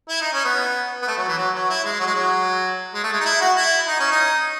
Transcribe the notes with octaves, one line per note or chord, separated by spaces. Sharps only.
E4
D#4
C#4
B3
B3
A3
F#3
E3
F#3
F#3
E4
G#3
F#3
G#3
F#3
G#3
A3
G#3
D#4
E4
F#4
E4
D#4
C#4
D#4